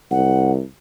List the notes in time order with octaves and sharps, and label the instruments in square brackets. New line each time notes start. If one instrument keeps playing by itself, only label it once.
[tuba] C2 [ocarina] F#5